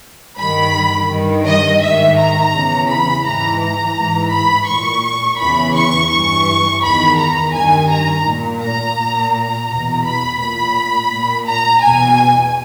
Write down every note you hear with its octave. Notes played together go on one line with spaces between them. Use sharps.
G2 D#3 B5
G2 D#3
D#5
G#2 D#3 E5
A#5
E2 C#3 E3
B5
G#2 E3 A#5
A#5
G#2 E3
B5
A#2 C#6
E2 C#3 E3 B5
C#6
G2 E3 C#6
E2 D#3 B5
A#5
G2 D#3 G#5
A#5
A#2
A#5
A#2
A#5
E2 B2
B5
A#2 B5
A#2
A#5
E2 B2 G#5